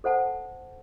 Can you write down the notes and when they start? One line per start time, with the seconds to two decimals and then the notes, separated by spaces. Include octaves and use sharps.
0.04 A4 C5 F#5 A5